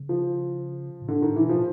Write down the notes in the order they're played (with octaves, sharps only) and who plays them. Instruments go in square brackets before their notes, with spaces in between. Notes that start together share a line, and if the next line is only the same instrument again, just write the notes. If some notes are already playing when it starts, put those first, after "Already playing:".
Already playing: [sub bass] C#3
[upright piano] F3
[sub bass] A2
[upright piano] D3
[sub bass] A2 [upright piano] D#3
[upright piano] E3
[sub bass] B2
[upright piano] F3